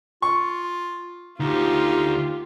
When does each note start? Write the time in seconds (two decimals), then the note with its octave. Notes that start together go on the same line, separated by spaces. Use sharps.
0.22 F4 C#6
1.40 D2 D#4 F4 G4